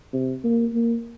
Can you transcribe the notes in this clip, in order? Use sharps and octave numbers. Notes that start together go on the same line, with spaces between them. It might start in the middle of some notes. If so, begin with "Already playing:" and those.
C3
A#3
A#3